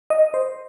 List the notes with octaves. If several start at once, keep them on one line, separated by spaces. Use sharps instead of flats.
D#5
C5